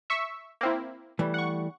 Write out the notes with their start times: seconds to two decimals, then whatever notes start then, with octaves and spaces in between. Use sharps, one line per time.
0.10 E5 C#6
0.61 A#3 C4 E4
1.19 E3 G3 A3
1.34 F#5 C#6